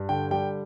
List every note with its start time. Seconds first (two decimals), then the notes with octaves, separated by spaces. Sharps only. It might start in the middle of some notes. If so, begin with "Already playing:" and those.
Already playing: G2
0.09 D3 G5
0.31 G3 G5